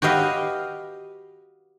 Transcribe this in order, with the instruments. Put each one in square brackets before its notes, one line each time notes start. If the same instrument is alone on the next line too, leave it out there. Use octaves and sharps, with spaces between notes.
[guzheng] F#4 G4 B4 D#5 F5